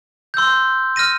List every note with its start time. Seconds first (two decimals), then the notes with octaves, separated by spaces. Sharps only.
0.34 C6 E6 G6
0.96 F6 A#6 D#7